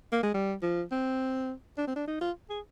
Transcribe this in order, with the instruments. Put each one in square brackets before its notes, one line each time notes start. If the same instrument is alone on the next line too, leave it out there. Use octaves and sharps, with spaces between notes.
[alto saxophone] A#3
G#3
G3
F3
C4
D4
C4
D4
D#4
F4
G#4